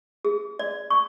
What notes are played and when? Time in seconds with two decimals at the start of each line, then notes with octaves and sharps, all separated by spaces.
0.25 G#4
0.59 D5
0.90 C#6